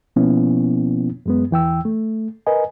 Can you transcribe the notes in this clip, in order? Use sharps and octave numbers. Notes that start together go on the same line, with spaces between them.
B2 F3 A#3 B3 C#4 E4
F#2 G#3 B3
E2 E3 G5 E6
A3
A#4 B4 D#5 G#5